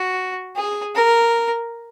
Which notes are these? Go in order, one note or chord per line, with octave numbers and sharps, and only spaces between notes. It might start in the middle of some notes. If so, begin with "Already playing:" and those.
Already playing: F#4
G#4
A#4